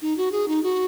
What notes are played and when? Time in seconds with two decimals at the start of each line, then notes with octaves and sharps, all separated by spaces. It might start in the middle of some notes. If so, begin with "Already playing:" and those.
0.02 D#4
0.17 F#4
0.32 G#4
0.48 D#4
0.63 F#4